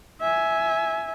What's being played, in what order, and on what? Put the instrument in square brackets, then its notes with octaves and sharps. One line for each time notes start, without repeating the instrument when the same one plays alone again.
[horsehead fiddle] E5 G#5